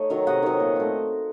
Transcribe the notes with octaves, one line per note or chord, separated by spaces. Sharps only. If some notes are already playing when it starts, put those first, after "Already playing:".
Already playing: A3 D#4 C#5 D#5
D#3 F#3
C3 D#5 F#5
D#3 F#3
A#2
A3 C4